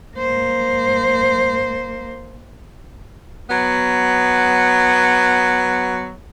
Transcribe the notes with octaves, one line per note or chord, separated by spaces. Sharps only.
A#3 C5
F#3 B3